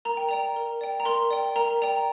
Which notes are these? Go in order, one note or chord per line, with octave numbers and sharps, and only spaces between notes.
A#4 A#5
G5
D5 G5 A#5
A#4
D5 G5
A#5
A#4 C6
D5 G5
A#4 A#5
D5 G5 A#5